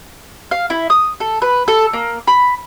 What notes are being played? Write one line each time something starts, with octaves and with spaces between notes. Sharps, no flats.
F5
E4
D#6
A4
B4
A4
A#3
B5